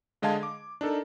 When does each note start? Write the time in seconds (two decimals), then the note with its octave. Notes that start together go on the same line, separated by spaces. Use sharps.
0.22 D3 G#3 D#5 F5 A5 G#6
0.43 D6
0.81 D4 D#4 A4 A#4